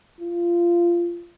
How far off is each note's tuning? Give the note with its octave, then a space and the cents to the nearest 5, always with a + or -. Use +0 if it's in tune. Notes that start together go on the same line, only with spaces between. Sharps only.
F4 -20